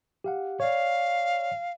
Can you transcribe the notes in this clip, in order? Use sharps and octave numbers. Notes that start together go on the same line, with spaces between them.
G4 F5 F#5
C#5 D5 F5